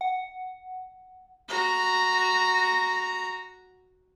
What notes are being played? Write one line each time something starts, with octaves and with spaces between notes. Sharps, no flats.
F#5
F#4 A#5